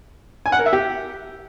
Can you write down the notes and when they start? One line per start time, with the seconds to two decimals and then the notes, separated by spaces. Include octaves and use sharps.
0.46 G#5
0.52 F#5
0.59 A#4
0.66 E5
0.73 G4